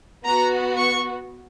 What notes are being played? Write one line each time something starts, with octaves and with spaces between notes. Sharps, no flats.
B3 F#4 A#5
C#6